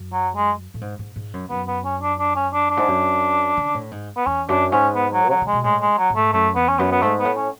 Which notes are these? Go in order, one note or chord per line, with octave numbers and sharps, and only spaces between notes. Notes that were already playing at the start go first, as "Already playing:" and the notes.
Already playing: F#2
F#3
G#3
A2
G#2
G#2
G#2
F#2
F#2 B3
B3
C#4
D4
D4
C#4
D4
D4
G#2
F#2
C#3
A2
G#2
B3
E2 C#4
F#2 D4
G#2 C#4
B3
F#3
D3 F#3
C#3
G#3
B2
A2 G#3
G#3
F#3
G#2
A3
F#2 A3
E2 B3
C#4
F#2 B3
B3
G#2 A3
B3
A2
C#4